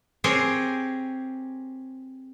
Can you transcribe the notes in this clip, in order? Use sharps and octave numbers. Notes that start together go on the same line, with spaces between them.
C4 G4 G#4 A#4 C5 C#5